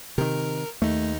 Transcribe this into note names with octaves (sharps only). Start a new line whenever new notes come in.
C3 D#3 A#4
D#2 A3 D#4